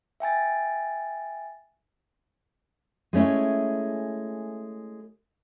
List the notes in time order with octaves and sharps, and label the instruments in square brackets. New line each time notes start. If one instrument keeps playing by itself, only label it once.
[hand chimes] E5 G5 G#5 A6
[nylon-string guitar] G#3 A3 C#4 E4